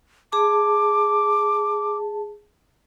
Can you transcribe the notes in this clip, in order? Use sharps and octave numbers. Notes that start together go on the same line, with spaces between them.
G#4 A5 D6